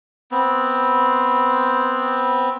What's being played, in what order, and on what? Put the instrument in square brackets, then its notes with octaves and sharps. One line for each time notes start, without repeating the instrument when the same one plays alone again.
[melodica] B3 C4